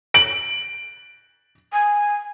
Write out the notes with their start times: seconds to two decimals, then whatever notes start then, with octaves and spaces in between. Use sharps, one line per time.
0.14 D7 F#7
1.73 G#5